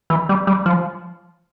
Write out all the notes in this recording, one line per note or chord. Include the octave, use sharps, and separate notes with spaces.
E3
G3
G3
F3